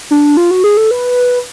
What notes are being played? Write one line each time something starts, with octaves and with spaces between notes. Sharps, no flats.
D4
F4
F#4
G#4
A4
B4